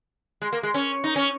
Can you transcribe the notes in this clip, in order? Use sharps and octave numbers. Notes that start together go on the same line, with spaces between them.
G#3
A#3
G#3
C#4
D#4
C#4